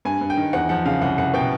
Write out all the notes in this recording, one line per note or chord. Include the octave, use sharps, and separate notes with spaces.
G2 G#5
G2
G5
D#3
E2 F#5
F3 F#5
C#3 F5
C2 F#5
C2 F#5
B2 G5